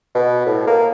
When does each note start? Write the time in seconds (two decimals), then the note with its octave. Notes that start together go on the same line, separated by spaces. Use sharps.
0.15 B2
0.46 A2
0.67 A#3